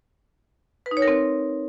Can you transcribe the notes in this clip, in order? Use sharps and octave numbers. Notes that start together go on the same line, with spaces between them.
B4
D#4
C#5
A#4
C4